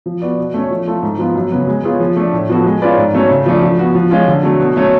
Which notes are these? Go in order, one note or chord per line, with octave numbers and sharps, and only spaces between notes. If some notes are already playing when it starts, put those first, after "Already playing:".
F3
B3 F#4 B4 D5
B2
A3 C#4
F3
A3 F4 A4
G#2
F3 B3 F4
F#2
C#3 F#3 B3
G#3
B3 F4 G#4 C#5
F3
A3 D4
A2
F3 B3 F#4 A4
G#3
C#4 F4 B4 D5
G#2
F#3 A3 C#4
C#3
F3 A3 D4
F3
B3 F#4
F3
G#3 C#4 F4
D3
F#3 A3
B2
F#3 A3 C#4